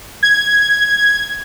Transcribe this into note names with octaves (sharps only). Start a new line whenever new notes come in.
G#6